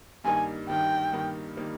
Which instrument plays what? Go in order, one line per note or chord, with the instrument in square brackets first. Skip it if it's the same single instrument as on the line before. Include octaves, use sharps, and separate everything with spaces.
[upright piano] G2 D#3 G3 A#3 D#4 [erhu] G#5
[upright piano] G2 D#3 G3 A#3 D#4 [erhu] G5
[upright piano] G2 D#3 G3 A#3 D#4
D#3 G3 A#3 D#4